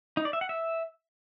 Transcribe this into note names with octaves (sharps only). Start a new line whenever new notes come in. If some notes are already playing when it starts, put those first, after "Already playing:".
D#4
D5
E5
F#5
E5